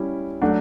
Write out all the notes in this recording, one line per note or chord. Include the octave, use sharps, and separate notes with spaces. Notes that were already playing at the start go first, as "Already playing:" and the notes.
Already playing: G3 C#4 E4
F#3 A3 D4 F#4